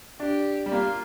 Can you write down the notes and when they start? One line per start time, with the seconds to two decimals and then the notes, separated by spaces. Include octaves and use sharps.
0.19 D4 G4
0.66 G3
0.72 A#3 F4